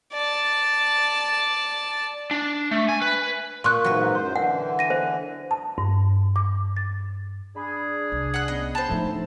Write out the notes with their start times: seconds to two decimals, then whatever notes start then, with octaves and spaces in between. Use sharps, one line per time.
0.13 D5 A5
2.31 D4
2.71 A3
2.89 G#5
3.02 B4
3.64 A#2 C6 C#6 F#6
3.84 G#2 E3 F#3 B4
4.15 F#2 C5 C6
4.36 D3 E3 F#5
4.79 A#6 D#7
4.90 C5
5.51 A5
5.78 G2
6.36 D6
6.77 A6
7.56 D4 G#4 B5
8.12 C2
8.34 F#5 F#6
8.48 B3 C#4 D#5
8.75 C5 G5 A5 B5 E7
8.88 A2 F3 A3 D4 D#4